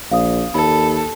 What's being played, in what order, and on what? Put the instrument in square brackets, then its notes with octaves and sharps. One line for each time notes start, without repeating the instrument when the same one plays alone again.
[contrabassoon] A#1 [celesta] F5 D#6
[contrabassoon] D#2 [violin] A4 [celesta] B5